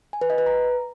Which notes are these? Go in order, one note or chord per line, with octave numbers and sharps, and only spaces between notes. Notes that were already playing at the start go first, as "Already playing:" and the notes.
G#5
B4
D#5
B4
A#5